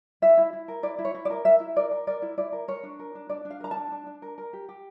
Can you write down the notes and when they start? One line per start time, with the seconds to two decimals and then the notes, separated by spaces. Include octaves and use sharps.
0.22 E4 E5
0.38 E4
0.53 E4
0.68 A#4
0.83 E4 D5
0.99 E4
1.05 C#5
1.15 E4
1.25 D5
1.30 A#4
1.45 A#4 E5
1.60 E4
1.76 A#4 D5
1.91 A#4
2.07 A#4 D5
2.22 E4
2.37 E4 D5
2.52 A#4
2.68 A#4 C#5
2.83 D4
2.99 A#4
3.15 D4
3.30 D4 D5
3.45 D4
3.50 F5
3.60 A#4 A#5
3.71 A5
3.77 D4
3.92 D4
4.06 D4
4.22 A#4
4.38 A#4
4.53 G4
4.69 G4